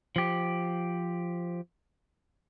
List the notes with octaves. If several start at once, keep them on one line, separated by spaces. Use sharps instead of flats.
F3 G4